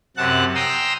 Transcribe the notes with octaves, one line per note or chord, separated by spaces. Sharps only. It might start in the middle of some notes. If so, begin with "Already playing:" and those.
F#2 C3 F#5 A5 F#6
G5 A#5 C6 D#6 E6